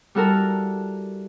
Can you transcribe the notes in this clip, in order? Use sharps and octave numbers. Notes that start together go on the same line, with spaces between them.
G3 E4 F#4 A4 A#4